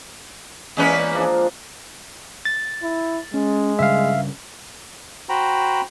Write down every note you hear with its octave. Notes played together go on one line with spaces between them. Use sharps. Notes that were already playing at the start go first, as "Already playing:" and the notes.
E2 G#3 A#3 C#4 B4
F3 G#3 D4
A6
E4
G#3 C#4
G2 C#3 G3 E5 F5
F#4 C5 G5 A#5 B5